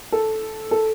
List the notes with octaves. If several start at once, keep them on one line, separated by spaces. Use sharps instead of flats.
A4
A4